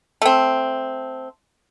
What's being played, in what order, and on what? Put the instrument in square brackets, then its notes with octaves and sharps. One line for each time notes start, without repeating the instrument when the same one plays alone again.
[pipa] A3 C4